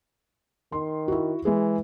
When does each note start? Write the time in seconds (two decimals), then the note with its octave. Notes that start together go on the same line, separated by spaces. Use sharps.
0.72 D#3 C6
1.08 E4 F#4
1.45 E3 G#3 G#4